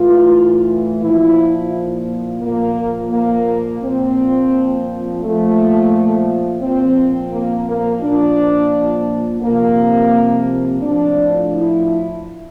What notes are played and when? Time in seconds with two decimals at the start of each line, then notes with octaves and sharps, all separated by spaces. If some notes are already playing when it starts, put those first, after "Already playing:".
Already playing: A2 E3 F4
1.01 A#2 F3 E4
2.42 A#2 F3 A#3
3.12 A#3
3.82 A#2 F3 C4
5.21 A#2 F3 A3
6.61 A#2 F3 C4
7.32 A#3
7.67 A#3
8.01 A#2 F3 D4
9.41 C3 F3 A#3
10.82 A2 F3 D4
11.52 E4